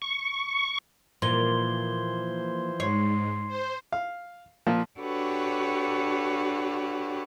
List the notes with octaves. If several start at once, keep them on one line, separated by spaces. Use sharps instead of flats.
C#6
A#2 E3 F3 C5 C6 G#6 G7
G#2 C#5 C6 C7
C5
F5
A#2 F3
D4 F#4 G4 A4 B4 C#5